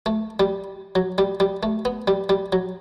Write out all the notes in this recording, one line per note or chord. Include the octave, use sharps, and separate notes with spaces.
A3
G3
F#3
G3
G3
A3
B3
G3
G3
F#3